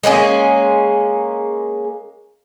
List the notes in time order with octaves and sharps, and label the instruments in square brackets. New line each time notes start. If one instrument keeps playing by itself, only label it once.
[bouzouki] G#3 A#3 C#4 G#4